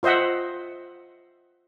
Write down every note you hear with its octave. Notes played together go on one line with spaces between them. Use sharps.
F4 C5 D#5 E5 F#5